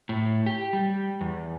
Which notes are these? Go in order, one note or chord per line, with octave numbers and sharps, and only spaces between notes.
A2
G4
G3
E2